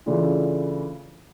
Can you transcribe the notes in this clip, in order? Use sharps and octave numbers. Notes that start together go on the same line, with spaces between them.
C#3 E3 A3 D4 F4